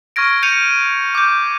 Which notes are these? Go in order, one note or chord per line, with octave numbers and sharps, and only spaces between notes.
C#6 F6 G#6 A#6 D7
G6 A#6 C#7 D#7 F7
D6 G6